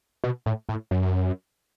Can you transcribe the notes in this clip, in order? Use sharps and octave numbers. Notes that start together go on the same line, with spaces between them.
B2
A2
A2
F#2